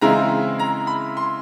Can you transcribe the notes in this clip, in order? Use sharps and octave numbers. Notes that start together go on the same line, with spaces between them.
C#3 E3 G#3 C4 E4 A#5
A#5
B5
C6